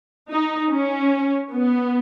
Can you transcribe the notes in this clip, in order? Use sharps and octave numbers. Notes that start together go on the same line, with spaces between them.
D#4
C#4
B3